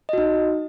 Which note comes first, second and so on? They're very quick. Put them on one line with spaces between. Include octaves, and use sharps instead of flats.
D#5 F#4 D#4